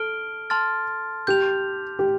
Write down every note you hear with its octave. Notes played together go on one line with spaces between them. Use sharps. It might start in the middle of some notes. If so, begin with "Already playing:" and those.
Already playing: A4 F6 D7 G7
A5 C6 F6 A6
G4 G6 F7
G4